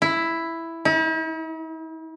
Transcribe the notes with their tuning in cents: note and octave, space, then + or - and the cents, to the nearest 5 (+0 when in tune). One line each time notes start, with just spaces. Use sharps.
E4 +5
E4 -45